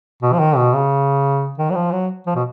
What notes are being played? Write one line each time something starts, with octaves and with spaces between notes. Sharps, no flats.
B2
F3
D#3
B2
C#3
D#3
F#3
F3
F#3
F3
B2